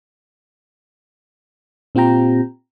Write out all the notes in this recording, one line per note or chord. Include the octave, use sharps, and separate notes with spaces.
A#2 C4 F4 G4 G5 A#5